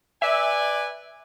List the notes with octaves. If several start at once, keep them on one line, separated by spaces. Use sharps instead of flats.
B4 D5 E5 G#5